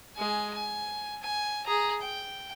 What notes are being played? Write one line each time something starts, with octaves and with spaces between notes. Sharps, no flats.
G#3 G#5
G#5
G#5
G#4 A#5
G5